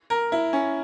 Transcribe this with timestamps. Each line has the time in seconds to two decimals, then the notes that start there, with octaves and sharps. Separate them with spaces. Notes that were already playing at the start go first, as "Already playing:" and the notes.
0.10 A#4
0.32 E4
0.53 C#4